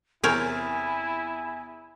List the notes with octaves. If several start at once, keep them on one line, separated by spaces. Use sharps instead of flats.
E2 C3 C4 E4 G#4 A#4 C#5 G#5